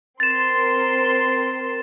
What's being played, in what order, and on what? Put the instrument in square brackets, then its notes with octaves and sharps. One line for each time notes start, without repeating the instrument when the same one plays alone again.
[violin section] C4 A#4 C6 [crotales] A6 E7